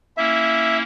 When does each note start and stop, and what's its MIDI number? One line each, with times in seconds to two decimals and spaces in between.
0.17 0.83 58
0.17 0.83 61
0.17 0.83 64
0.17 0.77 76